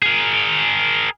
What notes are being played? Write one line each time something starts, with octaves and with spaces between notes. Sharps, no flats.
G#4 A#4